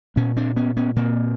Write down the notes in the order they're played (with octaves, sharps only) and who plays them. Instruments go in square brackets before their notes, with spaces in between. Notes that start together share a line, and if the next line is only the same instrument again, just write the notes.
[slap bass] A#2 B3 C#4
C4 D4
B3 C#4
B3 C#4
A#2 A#3 C4